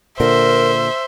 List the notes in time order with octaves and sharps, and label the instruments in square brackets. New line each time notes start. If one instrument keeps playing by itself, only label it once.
[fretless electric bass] A#2 D3 [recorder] A#4 [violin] C5 [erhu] E5